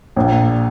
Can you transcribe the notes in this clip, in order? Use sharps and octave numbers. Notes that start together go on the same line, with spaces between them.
A#1 A#2